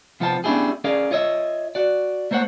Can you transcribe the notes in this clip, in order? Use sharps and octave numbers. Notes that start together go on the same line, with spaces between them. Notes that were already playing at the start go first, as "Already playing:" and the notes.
C3 F3 B3 F4 C5 A5
B3 C#4 D4 E4 G4 G#4
C#4 G#4 A#4 D5 F5
F4 C#5 D#5 E5
F#4 D5
A3 A#3 C5 C#5 F#5